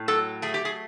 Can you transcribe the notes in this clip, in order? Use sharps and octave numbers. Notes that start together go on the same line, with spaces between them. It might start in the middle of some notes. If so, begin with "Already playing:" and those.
Already playing: A2
F#3 A4
A3 G#4
G4
G#4